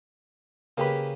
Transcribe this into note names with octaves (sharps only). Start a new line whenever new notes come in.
C#3 A#3 G4 B4